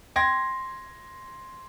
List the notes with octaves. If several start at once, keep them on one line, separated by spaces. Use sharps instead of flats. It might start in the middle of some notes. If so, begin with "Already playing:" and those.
G5 C6 G#6 A#6